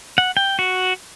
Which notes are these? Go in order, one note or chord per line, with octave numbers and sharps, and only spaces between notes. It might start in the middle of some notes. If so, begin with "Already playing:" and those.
F#5
G5
F#4